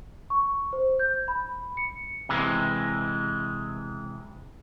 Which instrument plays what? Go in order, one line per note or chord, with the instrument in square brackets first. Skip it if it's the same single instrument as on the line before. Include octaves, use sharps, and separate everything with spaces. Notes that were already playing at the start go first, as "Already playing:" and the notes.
[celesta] C#6
C5
G6
B5
C#7
[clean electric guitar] C3 E3 G#3